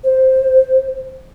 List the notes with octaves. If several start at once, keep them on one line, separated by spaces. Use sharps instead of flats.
C5